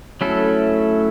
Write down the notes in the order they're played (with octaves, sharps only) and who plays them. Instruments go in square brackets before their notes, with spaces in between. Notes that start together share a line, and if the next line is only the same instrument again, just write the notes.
[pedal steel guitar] F#3 C#4 E4 A4 [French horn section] A3